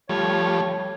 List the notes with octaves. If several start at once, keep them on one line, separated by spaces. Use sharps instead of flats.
F3 G3 A3 C#5